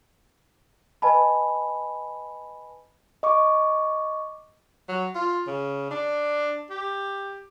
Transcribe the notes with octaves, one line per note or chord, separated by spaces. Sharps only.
B4 D#5 G#5 A5 B5
D#5 C#6 D6
F#3
F4
C#3
D4
G4